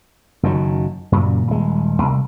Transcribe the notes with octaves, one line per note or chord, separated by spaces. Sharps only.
F#1 F#2 D#3 F#3
F#2 A#2 C#3
D#1 G#3
C2